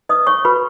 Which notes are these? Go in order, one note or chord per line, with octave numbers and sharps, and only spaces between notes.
B4 D#5 D#6
C#5 C#6
F#4 B4 B5